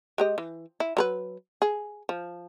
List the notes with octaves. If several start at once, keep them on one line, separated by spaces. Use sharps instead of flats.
G#3 G4 D#5
E3
E4
F#3 A#4 B4
G#4
F3